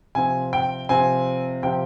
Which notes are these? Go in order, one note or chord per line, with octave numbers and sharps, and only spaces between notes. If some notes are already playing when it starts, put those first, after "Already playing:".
C3 F3 C4 G#5
G5
C3 F3 C4 G#5
C3 F3 C4 G5